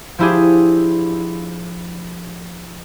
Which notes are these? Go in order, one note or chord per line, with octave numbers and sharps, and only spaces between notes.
F3 D4 E4 G4 G#4